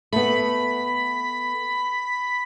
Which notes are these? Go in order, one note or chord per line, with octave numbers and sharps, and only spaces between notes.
A3 B3 B5